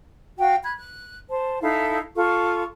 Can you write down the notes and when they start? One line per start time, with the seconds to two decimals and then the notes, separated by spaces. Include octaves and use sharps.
0.39 F#4 F5 G5
0.64 B5 F#6 G#6
0.76 F#6
1.30 C5 A5
1.61 D#4 E4 A4 F5
2.15 F4 A4 C#6